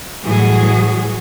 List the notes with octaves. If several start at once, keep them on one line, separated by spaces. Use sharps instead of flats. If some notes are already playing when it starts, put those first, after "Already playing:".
A2 E3 F#3 G3 F#4 G#4